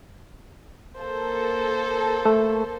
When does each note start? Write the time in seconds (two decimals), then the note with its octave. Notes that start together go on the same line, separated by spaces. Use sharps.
0.99 A#3 A4 C5
2.25 A3